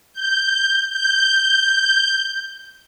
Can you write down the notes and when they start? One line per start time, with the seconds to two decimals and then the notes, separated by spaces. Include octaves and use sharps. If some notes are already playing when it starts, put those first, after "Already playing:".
0.13 G6
0.90 G6